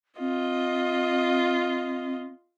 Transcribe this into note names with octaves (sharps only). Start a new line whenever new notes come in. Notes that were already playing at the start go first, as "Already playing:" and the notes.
C4 F4 D#5